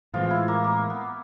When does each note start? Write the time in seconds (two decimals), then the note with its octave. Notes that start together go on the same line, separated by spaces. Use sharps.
0.14 A2 E3 F3 G#3 C4 F4
0.30 E4
0.48 A#3
0.64 A#3
0.90 B3